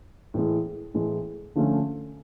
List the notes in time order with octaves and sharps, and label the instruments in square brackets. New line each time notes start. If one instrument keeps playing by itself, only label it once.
[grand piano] A2 E3 G#3
A2 E3 G#3
D3 F3 A3 C#4 F4